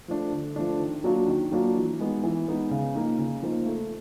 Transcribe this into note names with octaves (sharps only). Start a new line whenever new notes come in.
F3 A3 D4
D3
F3 A3 D4
D#3
F#3 A#3 D4 F4
D#3
F#3 A#3 D4 F4
E3
G#3 B3 D#4
E3
G#3 B3 D#4
C#3
F3 A#3 D#4
C#3
F3 A#3 D#4
A3